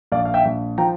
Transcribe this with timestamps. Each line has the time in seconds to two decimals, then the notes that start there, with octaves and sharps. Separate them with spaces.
0.12 A#1 D5 F5
0.25 F5
0.34 E5 G5
0.45 A#1
0.78 F3 G5 A#5